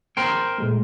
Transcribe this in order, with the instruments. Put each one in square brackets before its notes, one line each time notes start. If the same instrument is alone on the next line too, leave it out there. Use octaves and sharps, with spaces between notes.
[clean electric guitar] A#4 C5 G5
[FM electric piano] A#2 G#3 A3